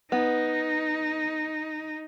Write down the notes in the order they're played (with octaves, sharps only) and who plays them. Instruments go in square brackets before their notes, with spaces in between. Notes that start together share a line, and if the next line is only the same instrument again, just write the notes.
[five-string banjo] B3 [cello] D#4